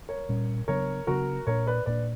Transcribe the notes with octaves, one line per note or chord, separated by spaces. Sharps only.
A#4 C#5
A#2 G3 C#4
C#3 F#3 B3 D4 A#4 C#5
C#3 F#3 B3 D4 F#4 A#4
A#2 A#3 D4 A#4 C#5
B4 D5
A#2 A#3 D4 B4 D5